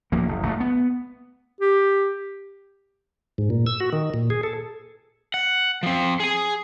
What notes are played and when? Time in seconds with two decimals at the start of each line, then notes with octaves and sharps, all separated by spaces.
0.12 D1 D2 F3 A#3
0.28 F#1
0.43 F#1 D3 A3
0.60 B3
1.61 G4
3.38 G#2
3.50 A#2
3.66 E6
3.80 F#4
3.93 D#3
4.14 A#2
4.30 G#4
4.43 A4
5.34 F#5
5.83 F3 C4
6.20 G#4 G#5